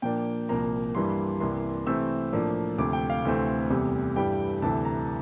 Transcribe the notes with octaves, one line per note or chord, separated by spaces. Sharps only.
A#2 F3 A#3 D4 G5
C2 A#2 F3 A#3 A#5
G2 E3 G3 A#3 C6
C2 C3 E3 A#3 C6
C3 E3 A3 C4 E6
A2 F3 A#3 D4
D2 C3 F3 D6
G5
F5
D2 C3 E3 A3 C4 F5
E2 C3 G3
G2 E3 G3 G5
D2 C3 E3 A5
A#5